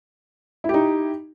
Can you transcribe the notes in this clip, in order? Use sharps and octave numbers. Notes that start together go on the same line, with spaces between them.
D#4 E4 G4